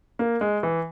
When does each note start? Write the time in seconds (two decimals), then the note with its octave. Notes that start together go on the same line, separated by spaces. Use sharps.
0.19 A#3
0.41 G#3
0.63 E3